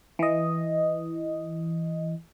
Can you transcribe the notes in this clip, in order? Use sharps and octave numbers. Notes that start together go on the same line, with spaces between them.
E3 D#5